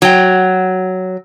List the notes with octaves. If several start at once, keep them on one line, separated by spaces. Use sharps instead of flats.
F#3 G5